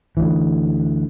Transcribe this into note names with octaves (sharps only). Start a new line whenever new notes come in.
D2 E3